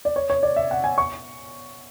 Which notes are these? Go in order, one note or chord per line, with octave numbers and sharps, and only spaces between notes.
D5
C#5
C#5
D5
E5
F#5
G#5
C#6